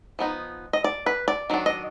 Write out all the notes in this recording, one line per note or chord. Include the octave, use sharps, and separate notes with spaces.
F3 B3 D#4
D#5
D5
B4
D5
D#3 F#3 D4
D#5